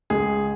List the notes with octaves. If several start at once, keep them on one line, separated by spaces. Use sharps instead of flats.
C#2 G#4